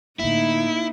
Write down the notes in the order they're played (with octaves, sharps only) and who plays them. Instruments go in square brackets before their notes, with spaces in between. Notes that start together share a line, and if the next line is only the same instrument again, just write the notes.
[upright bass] A2 D3 [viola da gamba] A#3 D#4 [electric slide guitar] E4